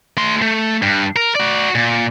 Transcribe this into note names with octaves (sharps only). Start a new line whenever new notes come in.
A3 C6
A3
G2
A#4
F#4 D5
A#2